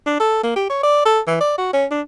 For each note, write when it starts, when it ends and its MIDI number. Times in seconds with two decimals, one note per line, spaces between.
0.06 0.15 62
0.20 0.39 69
0.43 0.55 58
0.56 0.67 67
0.70 0.83 73
0.83 1.03 74
1.06 1.20 69
1.27 1.37 52
1.41 1.54 74
1.58 1.72 66
1.73 1.85 61
1.91 2.01 62